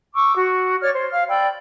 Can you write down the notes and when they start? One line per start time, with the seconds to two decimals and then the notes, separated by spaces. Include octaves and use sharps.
0.14 C#6 D6 E6
0.35 F#4
0.82 C#5 D5 C#6 F6
0.94 C5
1.11 F5 F6
1.29 D5 G5 B5 E6